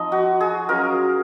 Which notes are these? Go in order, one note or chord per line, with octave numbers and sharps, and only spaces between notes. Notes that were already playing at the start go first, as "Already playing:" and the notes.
Already playing: F3 C4 D#4 D#5
F#4
G#4
F#3 C#4 F4 A#4